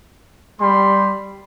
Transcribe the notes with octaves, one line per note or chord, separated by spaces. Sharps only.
G3 B5 C6